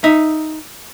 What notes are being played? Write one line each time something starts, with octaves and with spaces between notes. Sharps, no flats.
D#4 E5